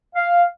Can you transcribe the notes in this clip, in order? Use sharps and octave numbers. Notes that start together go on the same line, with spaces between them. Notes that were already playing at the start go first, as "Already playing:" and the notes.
F5